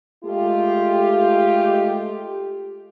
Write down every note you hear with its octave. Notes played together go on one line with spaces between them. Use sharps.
G#3 A3 F4 G4